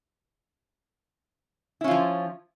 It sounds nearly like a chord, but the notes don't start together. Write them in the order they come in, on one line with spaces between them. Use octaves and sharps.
E4 C#4 F4 F3